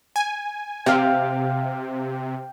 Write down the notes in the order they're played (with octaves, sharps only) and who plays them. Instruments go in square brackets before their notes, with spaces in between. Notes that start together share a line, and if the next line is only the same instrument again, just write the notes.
[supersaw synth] G#5
[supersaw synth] C3 [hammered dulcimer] F5 G5